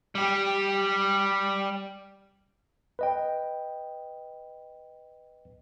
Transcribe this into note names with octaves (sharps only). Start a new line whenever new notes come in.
G3 G4
B4 D#5 G5